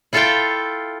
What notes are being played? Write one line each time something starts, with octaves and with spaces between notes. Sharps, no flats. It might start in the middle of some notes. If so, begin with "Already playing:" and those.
E4 F4 A4 E5 F5 G5